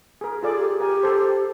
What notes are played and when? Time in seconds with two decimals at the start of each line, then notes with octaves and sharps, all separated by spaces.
0.21 G#4 A#4
0.43 F4 G#4 A4 D5
0.56 G4
0.80 G4 A#4 G#5
1.03 A4 C5